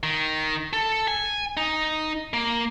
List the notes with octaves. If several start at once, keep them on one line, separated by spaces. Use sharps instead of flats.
D#3
A4
G#5
D#4
A#3